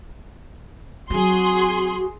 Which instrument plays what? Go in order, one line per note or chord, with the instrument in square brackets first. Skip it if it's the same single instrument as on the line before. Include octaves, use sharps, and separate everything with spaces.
[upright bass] F#3 C4 [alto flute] F#4 [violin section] G#4 C6